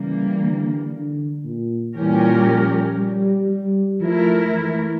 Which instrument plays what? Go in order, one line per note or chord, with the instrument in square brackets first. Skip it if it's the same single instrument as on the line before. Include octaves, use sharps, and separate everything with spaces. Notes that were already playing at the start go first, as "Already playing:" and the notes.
Already playing: [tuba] C#3 [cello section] E3 G3 A#3
[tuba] D3
D3
A#2
[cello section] A#2 G3 C#4 G4 A#4 [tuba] E3
[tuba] F3
G3
G3
[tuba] F3 [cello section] A3 E4 A#4
[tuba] E3